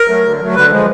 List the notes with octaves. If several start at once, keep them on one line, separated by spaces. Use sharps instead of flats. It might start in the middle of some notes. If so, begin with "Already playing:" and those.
Already playing: A#4
F#3 A3
D3
F#3 A3
D3 B4
F3 G#3